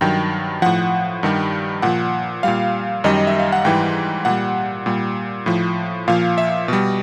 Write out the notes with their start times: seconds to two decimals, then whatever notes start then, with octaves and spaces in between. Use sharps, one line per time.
0.01 G2 D#3 F#3 G5
0.62 A2 F3 F#5
1.23 G2 D#3 G3
1.82 A#2 F3 F#5
2.43 A#2 G3 F5
3.04 F#2 D#3 G3 D#5
3.27 E5
3.39 F5
3.52 F#5
3.65 G#2 E3 G3 G5
4.25 A#2 G3 F#5
4.86 A#2 G3
5.46 A2 F3
6.08 A#2 F3 F5
6.38 E5
6.68 B2 G3